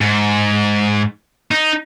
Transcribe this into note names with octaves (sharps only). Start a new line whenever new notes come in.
G#2
D#4